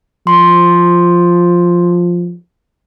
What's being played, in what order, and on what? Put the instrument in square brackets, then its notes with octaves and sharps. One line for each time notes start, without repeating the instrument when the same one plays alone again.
[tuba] F3 [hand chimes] C6